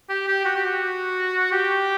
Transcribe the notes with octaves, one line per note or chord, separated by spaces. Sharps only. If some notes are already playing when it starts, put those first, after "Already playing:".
G4
G4
F#4
G4
F#4
G4